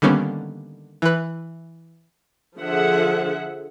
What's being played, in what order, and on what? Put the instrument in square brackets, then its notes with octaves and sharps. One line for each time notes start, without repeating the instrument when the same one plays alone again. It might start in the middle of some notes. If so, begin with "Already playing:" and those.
[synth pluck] D3 D#3 G3 A#3 B3 C#4
E3 B4
[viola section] D3 F3 G#4 E5 F#5